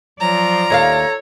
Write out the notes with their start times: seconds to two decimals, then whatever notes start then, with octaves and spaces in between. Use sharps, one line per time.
0.20 F3 F#3 F4 D5 A#5
0.70 D#2 A4 C#5 D#5 F5